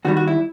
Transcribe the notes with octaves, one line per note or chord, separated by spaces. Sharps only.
D#2 D#3 G3 F#4
F#4
E4